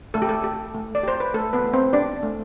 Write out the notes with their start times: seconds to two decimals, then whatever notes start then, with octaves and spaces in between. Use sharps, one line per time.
0.14 A3 A4
0.22 G4
0.29 A4
0.44 G4
0.74 A3
0.95 D5
1.03 G4 C5
1.20 B4
1.34 A3 A4
1.53 B3 B4
1.64 A3
1.73 C4 C5
1.93 D4 G4 D5
2.23 A3